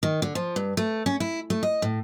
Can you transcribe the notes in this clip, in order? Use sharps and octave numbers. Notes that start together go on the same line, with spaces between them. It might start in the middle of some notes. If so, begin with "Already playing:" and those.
D#3
D3
F3
G2
A3
C#4
E4
A3
D#5
A2